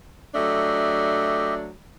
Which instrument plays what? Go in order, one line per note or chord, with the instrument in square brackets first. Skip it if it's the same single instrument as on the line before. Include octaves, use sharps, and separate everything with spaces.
[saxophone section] F#3 A3 D4 [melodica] G4 D#5 E5